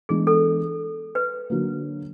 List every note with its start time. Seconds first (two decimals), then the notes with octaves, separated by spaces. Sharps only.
0.09 E3 G#3 B3 D4 G#4
0.27 A4
1.15 B4
1.50 D3 F#3 A#3